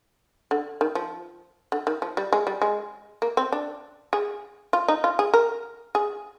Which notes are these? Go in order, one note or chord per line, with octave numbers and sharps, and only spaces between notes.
D3
D#3
F3
D3
D#3
F3
G3
G#3
G3
G#3
A#3
C4
D4
G#4
F4
D#4
F4
G#4
A#4
G#4